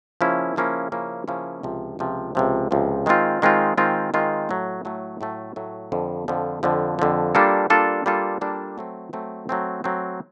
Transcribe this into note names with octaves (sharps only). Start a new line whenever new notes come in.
C#3 F3 A#3 C#4 E4
C#3 F3 A#3 C#4 E4
C#3 F3 A#3 C#4 E4
C#3 F3 A#3 C#4 E4
C#2 C3 F3
C#2 C3 F3
C#2 C3 F3
C#2 C3 F3
D#3 G#3 C4 F4
D#3 G#3 C4 F4
D#3 G#3 C4 F4
D#3 G#3 C4 F4
A2 F#3 A3
A2 F#3 A3
A2 F#3 A3
A2 F#3 A3
F2 D3 F3
F2 D3 F3
F2 D3 F3
F2 D3 F3
G3 A#3 D4 F4 A4
G3 A#3 D4 F4 A4
G3 A#3 D4 F4 A4
G3 A#3 D4 F4 A4
F#3 A3 C4
F#3 A3 C4
F#3 A3 C4
F#3 A3 C4